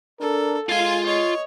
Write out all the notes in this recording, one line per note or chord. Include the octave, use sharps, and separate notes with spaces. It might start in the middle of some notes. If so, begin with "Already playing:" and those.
D4 A4 A#4
G#3 F4 F5 G#5 C6
C#5 D#5